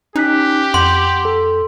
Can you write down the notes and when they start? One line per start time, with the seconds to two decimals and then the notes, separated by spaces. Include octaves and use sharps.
0.16 C#4 D#4 G4 F#6 B6
0.74 F2 F#5 C6 G6
1.25 A4